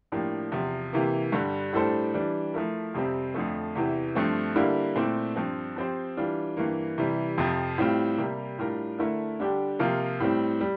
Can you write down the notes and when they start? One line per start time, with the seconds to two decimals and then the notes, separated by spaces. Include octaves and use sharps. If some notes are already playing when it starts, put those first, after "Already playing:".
0.12 A2 F3 A#3 D4 G4
0.52 E2 C3 F3
0.93 C3 E3 A#3
1.32 G2 D3 G3
1.73 A2 G3 D4 A4 C5
2.14 E3 G3 D4
2.54 F3 A3 E4 A#4
2.94 F2 C3 G3 C4
3.34 F2 D3 F3 A3
3.75 E2 C3 E3
4.15 G2 F3 A3 C4
4.56 D3 G3 A#3 E4
4.96 A#2 A3 C4 E4
5.36 G2 F3 C4
5.76 F3 C4 G4 C5
6.17 E3 G3 D4 F4
6.57 G2 E3 A#3
6.98 C3 E3 G3
7.38 F2 C3 F3
7.78 A2 G3 C4 F4
8.18 C3 G3 A#3
8.58 A2 G3 D4 F4 A#4
8.99 D3 A3 E4 A#4
9.40 D3 G3 D4 G4
9.79 C3 F3 A#3 F4
10.20 A2 G3 C4
10.61 G3